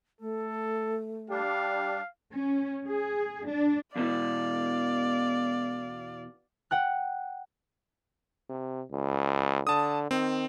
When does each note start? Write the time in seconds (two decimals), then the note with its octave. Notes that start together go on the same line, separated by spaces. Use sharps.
0.21 A3 A4
1.30 G3 D4 G4 F5
2.34 C#4
2.88 G#4
3.48 D4
3.96 E2 B2 E3 D5 F5
6.71 F#5 G5 F#6
8.49 C3
8.91 C#2
9.67 D3 A5 D#6
10.11 D#3 C4